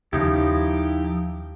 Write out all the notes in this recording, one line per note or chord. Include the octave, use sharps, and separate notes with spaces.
D#2 C#3 F3 D#4 E4 G4